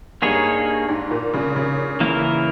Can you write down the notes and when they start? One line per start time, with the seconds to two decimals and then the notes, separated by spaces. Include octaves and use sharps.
0.22 G2 A#3 D#4 G#4 C#5
0.89 G#2
1.11 A#2
1.33 C#3
1.56 C#3
2.00 E3 A#3 E4 A#4